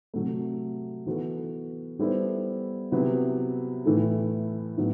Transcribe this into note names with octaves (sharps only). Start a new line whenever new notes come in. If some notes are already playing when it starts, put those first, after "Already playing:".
C3 F#3 A3
E3 B3 F#4 A4
G3 B3 E4 A4 C5
C3 F#3 B3 E4 G4
A2 E3 A3 E4 A4
A2 F#3 B3